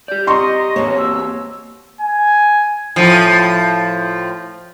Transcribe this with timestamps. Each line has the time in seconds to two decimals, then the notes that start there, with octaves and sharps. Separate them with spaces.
0.08 G4 D5 G6
0.27 D#5 A#5 C6 C#6
0.76 E2 A#3 C4 G4 C#5
0.98 E6
2.01 G#5
2.96 A2 F3